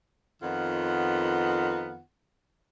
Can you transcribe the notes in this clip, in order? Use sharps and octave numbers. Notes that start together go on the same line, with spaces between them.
F2 D#3 B3 F4 F#5